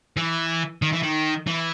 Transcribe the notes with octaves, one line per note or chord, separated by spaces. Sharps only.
E3
D#3
E3
D#3
E3